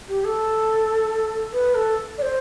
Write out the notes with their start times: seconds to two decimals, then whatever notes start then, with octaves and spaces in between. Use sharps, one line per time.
0.09 G4
0.25 A4
1.53 B4
1.75 A4
2.18 D5
2.22 C5